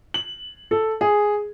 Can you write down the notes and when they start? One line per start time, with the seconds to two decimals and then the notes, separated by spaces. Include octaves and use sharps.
0.14 F#7
0.71 A4
1.01 G#4